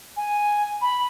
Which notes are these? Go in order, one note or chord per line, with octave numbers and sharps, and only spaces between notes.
G#5
B5